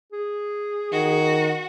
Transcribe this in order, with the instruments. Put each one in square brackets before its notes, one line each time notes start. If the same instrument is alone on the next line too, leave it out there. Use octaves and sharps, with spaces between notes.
[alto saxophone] G#4
[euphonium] D#3 [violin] F#4